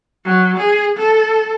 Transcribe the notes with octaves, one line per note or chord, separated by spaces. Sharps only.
F#3
G#4
A4